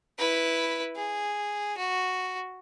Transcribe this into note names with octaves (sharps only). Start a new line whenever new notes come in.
E4 B4
G#4
F#4